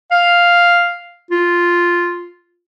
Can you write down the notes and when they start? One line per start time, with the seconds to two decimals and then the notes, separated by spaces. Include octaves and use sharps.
0.11 F5
1.31 F4